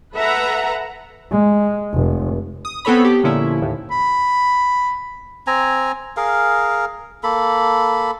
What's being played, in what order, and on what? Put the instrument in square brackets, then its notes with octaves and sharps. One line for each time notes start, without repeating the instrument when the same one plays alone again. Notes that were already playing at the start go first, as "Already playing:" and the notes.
[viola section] A4 B4 E5 F#5 A#5
[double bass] G#3
F1
[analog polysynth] D#6
B3 C4 A4 C#5 B5
G4
A#2 D3 F3 C#4 E4
D#2 A2
[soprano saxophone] B5
[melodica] C4 G#5 A#5
G#4 A#4 F5
A#3 A4 B5